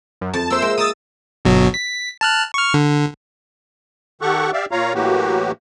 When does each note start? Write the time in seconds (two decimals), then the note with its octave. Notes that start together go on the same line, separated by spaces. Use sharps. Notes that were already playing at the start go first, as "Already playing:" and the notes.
0.21 F#2
0.34 F2 A5
0.50 A#3 C5 E5 E6
0.62 G#3 A#4 G5
0.78 A#3 D#6 E6 A6
1.45 G1 B2 F#3
1.74 B6
2.21 A5 F6 F#6
2.54 C#6 F6
2.74 D3
4.21 D#3 G4 A4 F#5 C#6
4.53 G4 D5 E5 F5
4.71 A#2 F4 C#5 F5 A#5
4.94 A2 E3 F#3 A#3 F#4 G4